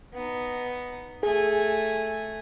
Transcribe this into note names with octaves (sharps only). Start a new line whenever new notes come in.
B3 D#4
A3 G#4 G#5